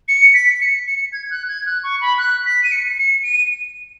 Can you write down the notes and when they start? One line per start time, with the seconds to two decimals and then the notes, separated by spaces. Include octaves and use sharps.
0.08 C#7
0.34 B6
0.61 C#7
0.87 C#7
1.13 G#6
1.31 F#6
1.49 G#6
1.66 F#6
1.84 C#6
2.01 B5
2.18 F#6
2.45 B6
2.64 D#7
2.72 C#7
2.98 C#7
3.23 D#7